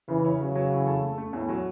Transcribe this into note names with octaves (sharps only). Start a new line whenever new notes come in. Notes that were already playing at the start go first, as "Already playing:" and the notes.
C#3 E3
C#4
C#3 F#3
F#3
E3
A4
A3
A3
E2 A2
F#3